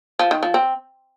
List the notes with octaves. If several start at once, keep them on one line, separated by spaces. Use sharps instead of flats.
F3
D#3
F3
C4